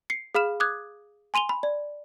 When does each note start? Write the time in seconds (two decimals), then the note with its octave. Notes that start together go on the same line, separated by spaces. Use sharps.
0.10 C7 C#7
0.35 G#4 F5 B5 F6 E7
0.60 D6 D#6 F#6 G#6
1.34 G#5 C6 D#7 F7 G7
1.49 B5
1.63 D5